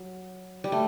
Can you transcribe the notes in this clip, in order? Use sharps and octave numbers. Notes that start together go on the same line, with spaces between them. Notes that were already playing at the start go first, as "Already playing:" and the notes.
Already playing: F#3
G3
A3